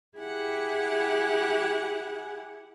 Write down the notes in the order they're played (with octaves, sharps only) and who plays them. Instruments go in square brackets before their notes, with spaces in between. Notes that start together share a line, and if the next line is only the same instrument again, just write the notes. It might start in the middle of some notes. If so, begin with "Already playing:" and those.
[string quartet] E4 G4 G#4 F#5 G#5